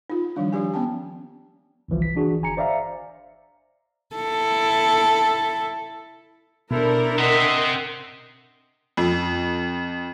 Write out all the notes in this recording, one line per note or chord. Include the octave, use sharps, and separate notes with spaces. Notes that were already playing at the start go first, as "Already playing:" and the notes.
D#4 F4
D#3 F3 G3 D4
F3 D4 G4 G#5
B3 C#4 G5 A5
G1 C2 E3 F3
B6
E3 D4 F#4 G#4
G1 G#5 A#5 C#7
C5 D5 E5 F5 A#5
E4 A4
B2 D4 E4 A4 A#4 C5
C4 D#5 E5 F#5 C6
F2